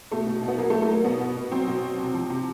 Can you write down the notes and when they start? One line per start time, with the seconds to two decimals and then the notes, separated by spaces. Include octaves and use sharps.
0.11 B2 A3
0.27 B2
0.42 B2
0.48 B3
0.58 F#3 A#3
0.70 A3
0.73 F#3
0.82 A3
0.89 F#3 A#3
1.04 B2 B3
1.21 B2
1.36 B2
1.51 F#3 C4
1.67 B2
1.82 F#3
1.98 C3
2.14 F3
2.30 C3